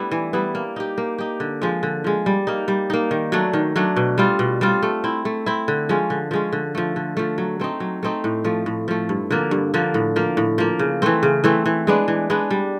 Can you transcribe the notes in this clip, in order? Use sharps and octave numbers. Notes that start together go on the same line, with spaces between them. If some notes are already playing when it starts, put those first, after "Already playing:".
Already playing: G3 A3 B3 D4 E4
E3
G3 B3 E4
A#3
D#4 G4
A#3
D#4 G4
D3
F3 G#3
D3
F3 G#3
G3
A#3 D#4
G3
A#3 D#4
D#3
F#3 A3 D4
D#3
F#3 A3 D4
B2
G3 C4 F4
B2
G3 C4 F4
A3
C4 E4
A3
C4 E4
D3
F3 G#3 C#4
D3
F3 G#3 C#4
D3
F3 A3
D3
F3 A3
F#3
A3 C4 D#4
F#3
A3 C4 D#4
A2
F3 A3
A2
F3 A3
G2
D3 F3 A#3
G2
D3 F3 A#3
A2
F3 A#3
A2
F3 A#3
C#3
E3 A3 C4
C#3
E3 A3 C4
E3
G#3 B3 D4
E3
G#3 B3 D4
G3